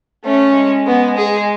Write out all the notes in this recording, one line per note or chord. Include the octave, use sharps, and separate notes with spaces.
A3 C#4
G#3
B3
G#4